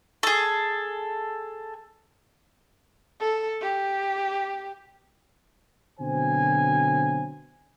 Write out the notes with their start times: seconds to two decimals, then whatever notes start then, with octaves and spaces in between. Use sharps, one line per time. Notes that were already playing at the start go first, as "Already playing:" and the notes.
0.23 G#4 A4
3.20 A4
3.61 G4
6.00 B2 D3 F#3 C4 C5 G#5